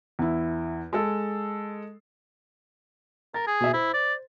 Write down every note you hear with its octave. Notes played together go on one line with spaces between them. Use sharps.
E2 E4
G#3 A4
A#4 A6
G#4
B2 E5
E4 C5
D5